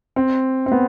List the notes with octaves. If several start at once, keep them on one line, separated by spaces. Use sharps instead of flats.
C4
C4
B3